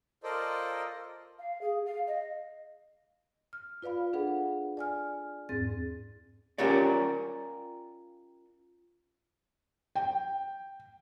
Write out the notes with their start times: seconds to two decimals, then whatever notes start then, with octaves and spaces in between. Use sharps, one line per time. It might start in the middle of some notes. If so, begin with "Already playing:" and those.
0.23 F4 A4 A#4 C5 D5 D#5
1.39 F5
1.61 G#4
1.86 F5
2.07 D#5
3.53 F6
3.82 F4 B4 D5 F5 B5
4.13 D4 G#4 A4 B4 F#5
4.77 D5 G#5 F6
5.49 E2 G#2 C4 G#4 A6
6.58 C#4 F4 G4 A#4 C#5 D5
9.95 G5